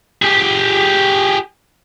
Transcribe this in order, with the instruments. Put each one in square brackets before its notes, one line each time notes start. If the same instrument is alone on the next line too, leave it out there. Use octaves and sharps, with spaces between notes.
[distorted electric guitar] G4 G#4